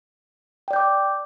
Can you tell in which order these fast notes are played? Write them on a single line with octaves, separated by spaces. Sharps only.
G5 D5 G6 D6